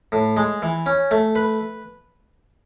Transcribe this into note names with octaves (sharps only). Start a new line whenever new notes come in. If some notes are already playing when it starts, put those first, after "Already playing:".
A2
G#3
E3
C#4
A3
B4